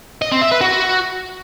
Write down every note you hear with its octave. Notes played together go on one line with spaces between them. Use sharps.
D#5
C4
E5
B4
F#4